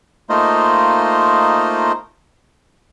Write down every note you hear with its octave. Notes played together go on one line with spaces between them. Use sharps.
A3 A#3 D#4 F4 C5 D#5